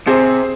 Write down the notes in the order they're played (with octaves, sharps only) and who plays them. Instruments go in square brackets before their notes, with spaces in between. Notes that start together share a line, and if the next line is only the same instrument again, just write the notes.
[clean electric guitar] C3 [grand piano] G#4 C5